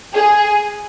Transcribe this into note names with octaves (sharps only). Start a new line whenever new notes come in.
G#4